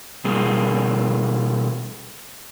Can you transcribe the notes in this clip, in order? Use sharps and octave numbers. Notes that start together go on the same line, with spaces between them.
B2 G3 A#3 G#4